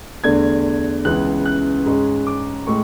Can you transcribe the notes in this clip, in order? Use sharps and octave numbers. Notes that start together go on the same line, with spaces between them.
E2 D3 A3 D4 G#6
C#2 C#3 E3 B3 F#6
F#6
G#2 G#3 C#4
D6
A2 G#3 C#6